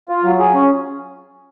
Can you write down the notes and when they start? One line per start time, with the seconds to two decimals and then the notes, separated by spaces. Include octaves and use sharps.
0.09 F4
0.24 F#3
0.39 G#4
0.54 C#4